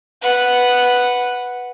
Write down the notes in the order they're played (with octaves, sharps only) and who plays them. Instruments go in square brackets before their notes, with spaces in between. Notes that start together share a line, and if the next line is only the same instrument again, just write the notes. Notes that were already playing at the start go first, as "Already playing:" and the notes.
[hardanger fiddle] B4 F#5